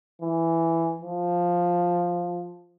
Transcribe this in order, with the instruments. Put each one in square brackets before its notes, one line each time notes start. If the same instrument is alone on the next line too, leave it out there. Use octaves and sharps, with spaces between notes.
[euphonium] E3
F3